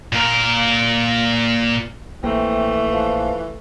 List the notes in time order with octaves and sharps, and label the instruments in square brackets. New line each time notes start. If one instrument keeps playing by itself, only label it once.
[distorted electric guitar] A#2 A#4
[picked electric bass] A#1 A#3 [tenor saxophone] E3 [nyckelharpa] A3 [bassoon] C4
[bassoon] F3